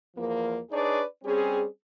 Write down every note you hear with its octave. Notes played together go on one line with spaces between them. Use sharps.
E2 F3 A#3
D4 D#4 G#4 B4 C#5 D5
G3 C4 C#4 G#4